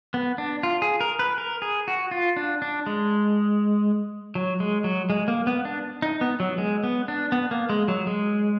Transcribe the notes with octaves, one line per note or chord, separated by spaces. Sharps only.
B3
D4
F4
G#4
A#4
B4
A#4
G#4
F#4
F4
D4
D4
G#3
F#3
G#3
F#3
G#3
A#3
B3
D4
D#4
B3
F#3
G#3
B3
D4
B3
A#3
G#3
F#3
G#3